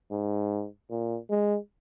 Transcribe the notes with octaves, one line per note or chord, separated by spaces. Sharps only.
G#2
A#2
G#3